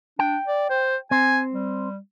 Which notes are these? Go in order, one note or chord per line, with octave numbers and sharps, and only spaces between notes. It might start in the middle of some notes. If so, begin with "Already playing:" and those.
D4 G5
D5
C5
C4 G#5
G3